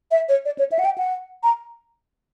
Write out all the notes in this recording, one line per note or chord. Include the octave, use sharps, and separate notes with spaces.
E5
C#5
D5
C#5
E5
F#5
G5
F#5
A#5